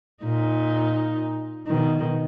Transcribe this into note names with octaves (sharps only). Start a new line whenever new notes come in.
A#2 D#4
B2 D#3